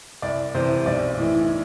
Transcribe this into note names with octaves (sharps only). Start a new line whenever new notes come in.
C2 D5
C3 E3 C5
B1 D5
A2 E3